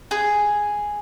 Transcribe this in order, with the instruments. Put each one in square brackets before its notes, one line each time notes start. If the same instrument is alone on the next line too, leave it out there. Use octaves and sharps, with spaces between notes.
[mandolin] G#4